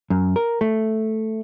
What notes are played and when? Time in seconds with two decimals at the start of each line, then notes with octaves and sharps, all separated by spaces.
0.10 F#2
0.36 A#4
0.61 A3